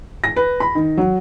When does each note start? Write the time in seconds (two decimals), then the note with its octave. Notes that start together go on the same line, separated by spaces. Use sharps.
0.24 A#6
0.36 B4
0.60 B5
0.75 D#3
0.97 F#3